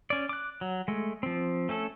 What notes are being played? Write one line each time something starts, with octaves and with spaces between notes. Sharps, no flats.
C#4 D5
D6 F#6
F#3
G#3 A3
F3 C4
A3 C#4 A4